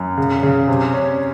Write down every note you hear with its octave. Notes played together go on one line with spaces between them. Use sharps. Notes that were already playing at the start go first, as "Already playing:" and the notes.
Already playing: F#2
C#3
C#3
C3
C#4